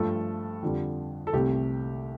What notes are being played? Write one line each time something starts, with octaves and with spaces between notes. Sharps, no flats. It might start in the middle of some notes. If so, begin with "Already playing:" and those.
Already playing: G2 F3 A3 A4
F2 D3 G3
A4
C2 C3 A3 G4